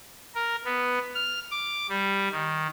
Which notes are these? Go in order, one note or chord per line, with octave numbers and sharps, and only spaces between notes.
A#4
B3
F6
D6
G3
D#3